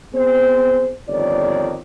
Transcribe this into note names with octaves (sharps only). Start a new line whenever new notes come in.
B3 C4 G#4 C5
G1 F2 D#3 C#5 D5